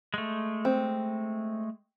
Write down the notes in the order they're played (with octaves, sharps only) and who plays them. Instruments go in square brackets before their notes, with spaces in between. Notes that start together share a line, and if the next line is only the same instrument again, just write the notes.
[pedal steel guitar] G#3 A3
[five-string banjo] C4